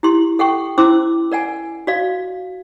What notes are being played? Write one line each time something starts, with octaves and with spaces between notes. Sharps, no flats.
E4 G4 C6
A4 F#5 G5 C#6
C#4 E4 C5 C6 D6 E6
A#4 D5 F#5 G#5
F#4 D5 F5